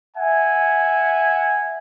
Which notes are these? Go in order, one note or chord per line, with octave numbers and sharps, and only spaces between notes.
E5 F#5 G#5